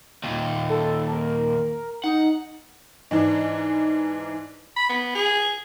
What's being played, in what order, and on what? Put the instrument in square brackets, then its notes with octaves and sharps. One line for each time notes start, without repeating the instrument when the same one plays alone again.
[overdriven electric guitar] D#2 A#2
[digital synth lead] A4
A#4
[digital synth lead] D#4 [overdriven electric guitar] F#5
[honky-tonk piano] G#2 E3 D4
[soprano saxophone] B5
B3
G#4